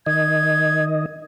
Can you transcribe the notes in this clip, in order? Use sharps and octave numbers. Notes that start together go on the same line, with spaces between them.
D#3 D#5 G#6